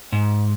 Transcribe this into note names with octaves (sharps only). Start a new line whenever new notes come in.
G#2